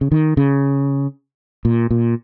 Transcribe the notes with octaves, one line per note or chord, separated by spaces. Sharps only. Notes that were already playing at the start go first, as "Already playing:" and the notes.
C#3
D#3
C#3
A#2
A#2